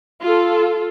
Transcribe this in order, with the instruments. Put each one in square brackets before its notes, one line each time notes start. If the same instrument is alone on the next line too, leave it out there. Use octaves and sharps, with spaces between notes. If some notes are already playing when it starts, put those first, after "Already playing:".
[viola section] F4 A4